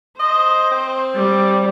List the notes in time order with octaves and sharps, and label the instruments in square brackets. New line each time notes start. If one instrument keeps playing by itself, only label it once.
[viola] C5 [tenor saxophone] D#5
[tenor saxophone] C4
[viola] G3